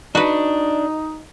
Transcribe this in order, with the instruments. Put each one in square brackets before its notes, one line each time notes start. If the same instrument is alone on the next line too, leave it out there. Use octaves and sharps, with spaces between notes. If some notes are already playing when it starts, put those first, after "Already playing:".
[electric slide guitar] D4 [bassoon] D#4 [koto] F#4 B4